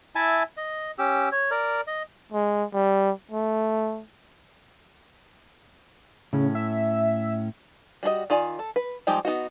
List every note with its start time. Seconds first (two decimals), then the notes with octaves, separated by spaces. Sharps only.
0.15 E4 E5 G#5 A5
0.57 D#5
0.99 C#4 G4 E6
1.32 C#5
1.51 A#4 D5
1.87 D#5
2.32 G#3
2.73 G3
3.31 A3
6.33 A2 C#3 C#4
6.55 E5
8.03 G3 F#4 A4 D#5
8.30 D#3 F4 D5 G#5
8.59 A4
8.76 B4
9.07 F3 G3 G#3 D#4 G4
9.25 B3 D#4 F#4